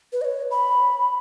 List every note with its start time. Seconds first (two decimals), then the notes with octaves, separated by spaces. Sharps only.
0.13 B4
0.21 D#5
0.25 C#5
0.51 B5